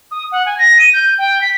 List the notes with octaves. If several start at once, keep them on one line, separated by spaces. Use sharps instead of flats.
D#6
F#5
G#5
A#6
D#7
G6
G5
B6